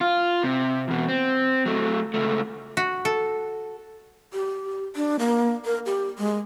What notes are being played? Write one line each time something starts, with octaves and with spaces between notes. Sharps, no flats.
F4
C3
E2 B2
C4
F#3 A3
C#2 A3
F#4
A4
G4
D4
A#3
A#4
G4
G#3